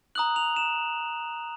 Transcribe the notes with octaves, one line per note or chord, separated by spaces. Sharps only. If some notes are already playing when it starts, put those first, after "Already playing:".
A#5 D#6 F#6 F#7
F7
E7